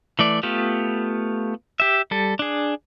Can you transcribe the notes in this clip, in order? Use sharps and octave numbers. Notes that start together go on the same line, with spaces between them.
E3 A3 D5
A3 B3 F4 G4
G4 E5
G3 A4
D4 G#4